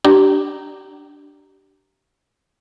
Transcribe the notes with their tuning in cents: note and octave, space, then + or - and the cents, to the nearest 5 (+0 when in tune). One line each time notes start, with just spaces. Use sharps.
D4 +0 G4 -30 A#5 -10